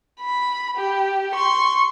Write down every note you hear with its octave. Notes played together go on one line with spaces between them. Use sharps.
B5
G4
C6 C#6